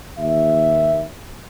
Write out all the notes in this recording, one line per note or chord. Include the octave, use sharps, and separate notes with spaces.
D#2 E5